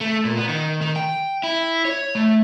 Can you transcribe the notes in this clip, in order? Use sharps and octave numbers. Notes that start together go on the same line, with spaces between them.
A3
A#2
B3
D#3
D#3
G5
E4
C#5
A3